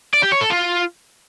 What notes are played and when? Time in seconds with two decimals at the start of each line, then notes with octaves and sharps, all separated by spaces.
0.14 D5
0.23 G4
0.32 C#5
0.41 A4
0.50 F4